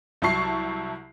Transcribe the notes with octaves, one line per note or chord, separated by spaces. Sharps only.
C2 F#3 E4 A5 C#6 C7